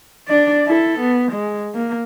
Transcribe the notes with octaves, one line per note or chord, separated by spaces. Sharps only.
D4 D5
E4 A4
B3
G#3
A#3